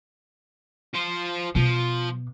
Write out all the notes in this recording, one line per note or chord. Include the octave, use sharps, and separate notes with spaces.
F4 C5
B2 F3